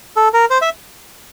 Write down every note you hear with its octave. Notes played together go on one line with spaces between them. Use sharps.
A4
A#4
C5
E5